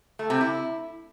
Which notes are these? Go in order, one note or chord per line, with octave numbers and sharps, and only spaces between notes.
A3
C3
E4